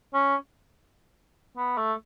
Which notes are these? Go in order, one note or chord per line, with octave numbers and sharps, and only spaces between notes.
C#4
B3
A3